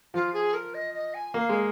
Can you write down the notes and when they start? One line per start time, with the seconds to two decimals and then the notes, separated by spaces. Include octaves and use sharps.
0.14 F3 F4
0.34 G#4
0.54 A#4
0.74 D#5
0.94 D#5
1.14 G#5
1.34 A#3 F5
1.49 G#3